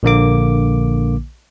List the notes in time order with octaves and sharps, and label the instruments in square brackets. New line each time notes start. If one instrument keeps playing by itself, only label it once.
[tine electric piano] A#1 D3 A#3 D6